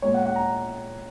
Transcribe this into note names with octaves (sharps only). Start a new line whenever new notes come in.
A#2 G#3 C#5
F#5
F#5
A#5